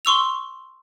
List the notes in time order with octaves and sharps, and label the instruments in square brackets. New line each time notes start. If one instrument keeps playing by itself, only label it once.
[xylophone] C6 C#6 E6 F7